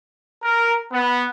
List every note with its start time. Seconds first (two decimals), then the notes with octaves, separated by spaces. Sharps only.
0.43 A#4
0.92 B3